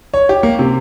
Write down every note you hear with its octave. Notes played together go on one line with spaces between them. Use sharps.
C#5
G4
A#3
C3